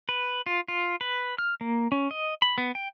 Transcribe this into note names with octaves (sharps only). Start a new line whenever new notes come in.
B4
F4
F4
B4
F6
A#3
C#4
D#5
B5
B3
G5